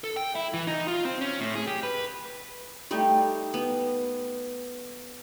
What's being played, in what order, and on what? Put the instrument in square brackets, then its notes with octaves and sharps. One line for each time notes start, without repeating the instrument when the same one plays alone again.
[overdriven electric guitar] A4
G5
E4
E3
D#4
F4
C4
C#4
A2
G#4
G4
B4
[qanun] G3 A3 D#4 G4
B3